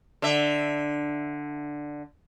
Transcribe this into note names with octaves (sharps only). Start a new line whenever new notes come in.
D3 E5